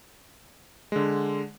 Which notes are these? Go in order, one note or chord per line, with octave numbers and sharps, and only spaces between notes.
D3 G#3